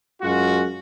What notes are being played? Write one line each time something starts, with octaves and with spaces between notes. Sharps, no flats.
F#2 G#3 F4 F#4